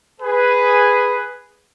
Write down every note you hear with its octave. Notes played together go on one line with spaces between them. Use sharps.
G#4 B4